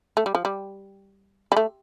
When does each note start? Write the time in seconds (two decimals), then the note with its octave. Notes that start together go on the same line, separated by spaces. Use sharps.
0.17 A3
0.26 G3
0.35 F3
0.45 G3
1.52 G3
1.57 A3